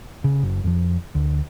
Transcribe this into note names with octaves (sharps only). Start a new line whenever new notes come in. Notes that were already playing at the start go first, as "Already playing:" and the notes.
C#3
F#1
F2 F3
D2